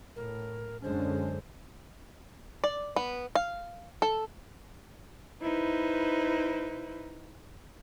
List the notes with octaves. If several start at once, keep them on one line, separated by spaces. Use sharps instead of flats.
A2 A#4
F#2 D3 G#3 C#4 D4 C5
D5
B3
F5
A4
D#4 E4 B4 C5